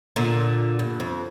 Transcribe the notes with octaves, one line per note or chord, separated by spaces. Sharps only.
A#2 D3
G2
F2